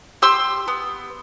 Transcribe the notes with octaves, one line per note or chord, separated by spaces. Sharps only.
G4 C6 E6
B3